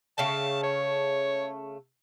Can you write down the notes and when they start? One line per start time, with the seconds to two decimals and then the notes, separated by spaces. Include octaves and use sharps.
0.18 C#3 A3 G5 A5
0.63 C#5